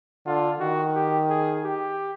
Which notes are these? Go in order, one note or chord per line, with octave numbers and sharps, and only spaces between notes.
D3 F4
D#3 F#4
G4
G#4
G4